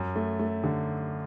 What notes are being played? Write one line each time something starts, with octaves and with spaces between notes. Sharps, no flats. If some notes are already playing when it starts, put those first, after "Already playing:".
Already playing: F#2
A3
A3
D3